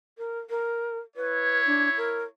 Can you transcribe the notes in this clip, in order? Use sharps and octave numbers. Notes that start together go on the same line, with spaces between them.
A#4
A#4
E4 B4 C#5
D4
A#4